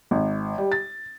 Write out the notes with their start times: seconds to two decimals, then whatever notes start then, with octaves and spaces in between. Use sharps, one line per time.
0.11 G#1
0.58 G3
0.72 A6